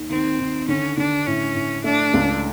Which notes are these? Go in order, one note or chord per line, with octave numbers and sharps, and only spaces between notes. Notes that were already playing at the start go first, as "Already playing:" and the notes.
Already playing: D#2
D#3 C4
D#3
D3 C#4
D3 D4
A2 C#4
A2
A3 D4
C#2